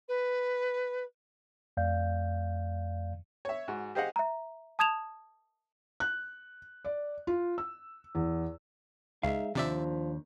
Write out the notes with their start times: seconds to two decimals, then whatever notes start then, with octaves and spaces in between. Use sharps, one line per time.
0.08 B4
1.77 F2 A3 D5 F5 G6
3.45 C#5 E5
3.68 G#2 F#4
3.95 G4 G#4 C5 D#5 F5 F#5
4.16 E5 A#5
4.79 A5 D#6 G#6 E7 F7
6.00 F#6
6.85 D5
7.27 F4
7.58 E6
8.15 E2
9.23 C#2 G#3 D#4 E5 F5
9.55 D#2 C3 F3 D4 D5 E5